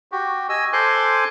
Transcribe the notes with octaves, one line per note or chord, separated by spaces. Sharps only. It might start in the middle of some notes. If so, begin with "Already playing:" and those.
F#4 G4
D#5 G#5 E6
A4 C5 G#5 C6 D6 F#6